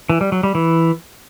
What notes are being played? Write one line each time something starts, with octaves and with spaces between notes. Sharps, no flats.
E3
G3
F#3
G3
E3